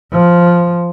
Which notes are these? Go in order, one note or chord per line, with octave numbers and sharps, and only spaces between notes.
F3